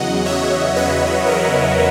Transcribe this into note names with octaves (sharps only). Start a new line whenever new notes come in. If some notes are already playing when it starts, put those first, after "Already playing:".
Already playing: E2 C#3 F#3 D#5 F#5
C#5 E5
B4 D#5
A#4